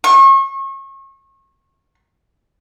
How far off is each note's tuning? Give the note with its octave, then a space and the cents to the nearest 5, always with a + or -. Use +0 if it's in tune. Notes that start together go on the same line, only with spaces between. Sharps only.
C#6 -35